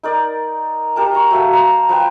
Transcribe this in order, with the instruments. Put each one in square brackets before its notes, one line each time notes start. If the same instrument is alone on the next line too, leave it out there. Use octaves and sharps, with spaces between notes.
[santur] D#4 A#4 D5
G4 A#4 A5
A#5 C#6
F#3 A3 F5
C5 A5 A#5
F3 B4 G5